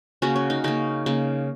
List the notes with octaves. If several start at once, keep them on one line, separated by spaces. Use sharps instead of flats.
C#3 A#3 C#4 F#4
C#4
D#4
C#3 A#3 D#4
C#3 A#3